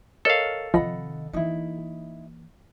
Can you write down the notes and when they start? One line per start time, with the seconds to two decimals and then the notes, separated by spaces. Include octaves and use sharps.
0.25 A4 A#4 C#5 D#5 F5
0.74 C3 D#3 F3 D#5 F#5 B5
1.33 E3 A#3 D#4 E4